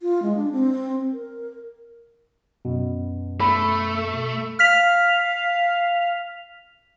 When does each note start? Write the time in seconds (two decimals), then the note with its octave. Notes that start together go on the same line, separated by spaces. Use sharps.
0.01 F4
0.22 G#3
0.36 D4
0.52 C4
1.13 A#4
2.65 F#2 B2
3.40 A3 B5
4.59 F5 F6 B6 F7